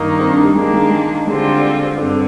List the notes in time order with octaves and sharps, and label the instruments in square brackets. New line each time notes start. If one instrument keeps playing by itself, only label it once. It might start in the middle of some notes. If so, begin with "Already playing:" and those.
Already playing: [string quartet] G2 D#3 A#3 D#4
[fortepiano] C4
D4
G3
[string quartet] D#3 A#3 D4 [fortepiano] G#3
[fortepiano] G#3
G#3
[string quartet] D3 G3 C4 F4 [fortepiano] G#3
[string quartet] G2 D3 [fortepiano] C4